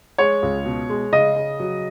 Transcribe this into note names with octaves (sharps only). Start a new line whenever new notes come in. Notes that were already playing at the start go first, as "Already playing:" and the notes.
G#3 C#5
C#2
B2
G#3
C#3 D#5
C#3
F#3